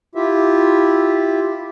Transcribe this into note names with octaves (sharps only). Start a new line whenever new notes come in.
E4 F4 G4 E5